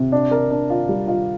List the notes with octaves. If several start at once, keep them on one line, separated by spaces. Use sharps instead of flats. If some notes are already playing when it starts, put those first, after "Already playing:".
Already playing: C3
D4
A#4
D4
F4
G3
F4